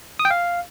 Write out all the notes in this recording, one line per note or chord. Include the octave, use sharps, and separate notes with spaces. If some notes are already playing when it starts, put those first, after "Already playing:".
D#6
G5
F5